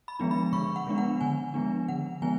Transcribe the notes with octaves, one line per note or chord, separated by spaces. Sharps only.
B5
F3 G#3 B3 D4
B5
D3 C#6
F#5
F3 G#3 B3 D4
F#5
D3 G#5
F3 G#3 B3 D4
D3 F#5
F3 G#3 B3 G#5